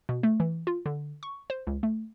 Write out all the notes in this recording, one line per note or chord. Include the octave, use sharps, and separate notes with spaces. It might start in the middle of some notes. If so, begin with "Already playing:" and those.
B2
A3
E3
F4
D3
C#6
C5
C#2
A3